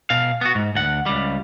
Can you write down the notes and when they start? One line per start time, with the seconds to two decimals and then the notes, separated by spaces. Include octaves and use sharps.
0.10 B2 F5
0.41 B3 F#4
0.55 G#2
0.75 D2 F#5
1.06 C#2 G3